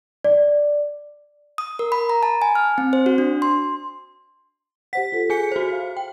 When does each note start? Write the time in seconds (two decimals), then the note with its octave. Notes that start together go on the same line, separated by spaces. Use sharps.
0.24 D5
1.58 D#6
1.79 A#4
1.92 B5
2.10 A#5
2.23 A5
2.42 G#5
2.55 F6
2.78 C4
2.93 C5
3.06 F#4
3.18 D4
3.42 C6
4.93 G4 C5 F#5 B6
5.12 F4 A4
5.30 G#4 G#5 C#7
5.52 F#4 C5
5.71 F5
5.97 G5